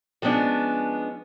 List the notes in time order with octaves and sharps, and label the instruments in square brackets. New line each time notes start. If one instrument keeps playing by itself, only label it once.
[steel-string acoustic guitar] F3 G#3 B3 C#4 D4